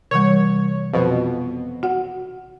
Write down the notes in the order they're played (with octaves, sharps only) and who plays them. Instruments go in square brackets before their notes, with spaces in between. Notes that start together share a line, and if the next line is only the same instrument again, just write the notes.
[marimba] C3 E3 G3 [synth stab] C#5
[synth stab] F2 B2
[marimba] F#4 F#5